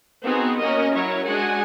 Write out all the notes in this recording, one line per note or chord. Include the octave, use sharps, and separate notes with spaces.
B3 C4 D#4 F#4 G#4
A#3 C#4 F#4 A#4 D#5
F#3 E4 A#4 C#5
G#3 D4 F#4 F#5 G#5